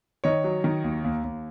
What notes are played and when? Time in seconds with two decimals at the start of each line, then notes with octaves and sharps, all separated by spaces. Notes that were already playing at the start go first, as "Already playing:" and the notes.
0.24 D#3 C#5 D#5
0.44 F#3
0.64 D#3
0.84 D#2
1.04 D#2
1.24 D#2